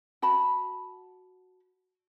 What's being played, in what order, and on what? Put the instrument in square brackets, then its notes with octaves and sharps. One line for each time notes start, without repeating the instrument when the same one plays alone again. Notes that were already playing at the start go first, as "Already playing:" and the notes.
[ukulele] F#4 A5 B5